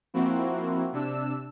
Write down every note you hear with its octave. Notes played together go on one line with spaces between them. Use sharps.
F3 A#3 C4 E4 F#4
C3 D4 E6